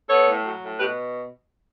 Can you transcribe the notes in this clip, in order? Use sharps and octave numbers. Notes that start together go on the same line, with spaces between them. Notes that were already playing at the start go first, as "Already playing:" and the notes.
B3 A4 C#5
A2
F#3
A2
B2 G4 B4